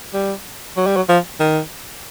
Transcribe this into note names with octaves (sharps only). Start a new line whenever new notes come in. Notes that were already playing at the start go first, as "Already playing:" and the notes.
G3
F#3
G3
F#3
F3
D#3